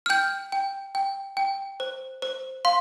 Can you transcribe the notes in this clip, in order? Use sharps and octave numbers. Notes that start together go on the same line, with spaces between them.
F6
G5 G6
G5
G5
G5
C5
C5
F5 C6